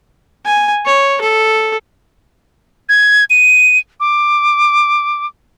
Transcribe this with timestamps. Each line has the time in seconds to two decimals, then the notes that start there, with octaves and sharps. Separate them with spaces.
0.46 G#5
0.86 C#5
1.21 A4
2.89 G#6
3.30 D#7
4.00 D6